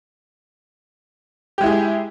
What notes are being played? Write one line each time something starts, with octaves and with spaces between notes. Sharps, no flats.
G#3 E4 G4 G#4